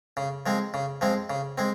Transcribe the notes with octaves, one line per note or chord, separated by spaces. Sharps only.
C#3
F3 G#3 C4
C#3
F3 G#3 C4
C#3
G#3 C4